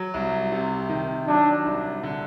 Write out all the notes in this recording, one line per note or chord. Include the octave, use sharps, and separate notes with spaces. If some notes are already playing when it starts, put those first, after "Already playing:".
Already playing: F#3
C2
C3
D#3
F#3 D4
C2
D3